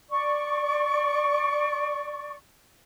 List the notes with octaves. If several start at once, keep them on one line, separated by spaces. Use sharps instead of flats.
D5 C#6